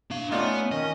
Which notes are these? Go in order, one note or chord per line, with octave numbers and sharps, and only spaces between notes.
D4 F5
A3 B3 C#4 D#4 F4 D5
D#3 C#4 D#5